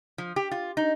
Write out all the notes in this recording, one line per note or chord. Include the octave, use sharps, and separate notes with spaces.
F3
G4
F4
D#4